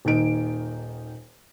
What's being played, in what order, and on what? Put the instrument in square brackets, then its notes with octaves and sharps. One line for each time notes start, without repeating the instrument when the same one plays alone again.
[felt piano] D#1 D#3 D#4 D7